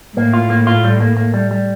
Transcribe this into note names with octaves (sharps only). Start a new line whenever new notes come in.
A2 A#3
F4
A#3
F4
G3
A#3
A#3
G3
G3